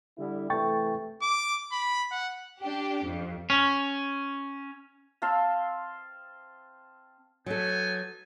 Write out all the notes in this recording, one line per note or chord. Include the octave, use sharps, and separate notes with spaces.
D3 G3 E4
C3 E3 A3 G5 C#6 A6
D6
B5
F#5
D4 G4
F2
C#4
C4 F5 A5 C6
F#3 B3 D#4 A4 G#5